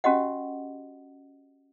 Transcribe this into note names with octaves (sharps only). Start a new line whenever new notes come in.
C#4 F#4 G4 D#5 F#5